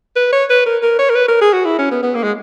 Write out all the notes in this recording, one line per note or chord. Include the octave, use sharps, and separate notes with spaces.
B4
C#5
B4
A#4
A#4
C#5
A#4
B4
A#4
G#4
F#4
E4
C#4
B3
B3
A#3
G#3